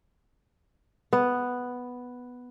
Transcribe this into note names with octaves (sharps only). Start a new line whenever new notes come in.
B3